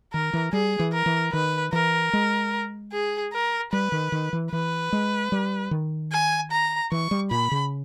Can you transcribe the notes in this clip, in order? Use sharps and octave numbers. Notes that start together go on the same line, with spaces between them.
D#3 A#4
E3
G3 G#4
E3
A#4
E3
D#3 B4
E3 A#4
G#3
G#4
A#4
G3 B4
D#3
D#3
E3
E3 B4
G#3
G3
D#3
G#5
A#5
E3 C#6
G3
A#2 B5
C#3